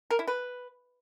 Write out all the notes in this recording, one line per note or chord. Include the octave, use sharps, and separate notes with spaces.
A#4
E4
B4